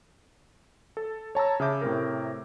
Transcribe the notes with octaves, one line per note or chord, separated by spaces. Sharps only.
A4
C#5 A5 A#5 E6
C#3 G#4 E5 D6 G6
A2 C3 A#4